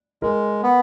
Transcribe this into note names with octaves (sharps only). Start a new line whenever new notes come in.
G#3 A#4
B3